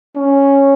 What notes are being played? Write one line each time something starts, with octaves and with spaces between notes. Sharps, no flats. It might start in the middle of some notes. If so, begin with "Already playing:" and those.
C#4